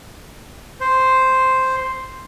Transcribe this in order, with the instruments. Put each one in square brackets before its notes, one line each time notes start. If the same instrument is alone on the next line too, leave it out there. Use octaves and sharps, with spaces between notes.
[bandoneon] C5